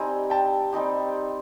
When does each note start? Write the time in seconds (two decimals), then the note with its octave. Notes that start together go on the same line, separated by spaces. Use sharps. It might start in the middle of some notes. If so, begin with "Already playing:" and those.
Already playing: G3 C4 D#4 G4 G#5 A#5
0.30 G5 A5
0.73 G3 C4 D#4 G4